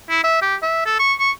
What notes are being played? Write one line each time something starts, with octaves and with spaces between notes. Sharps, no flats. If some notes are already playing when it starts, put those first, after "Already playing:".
E4
E5
G4
E5
A4
C#6
C#6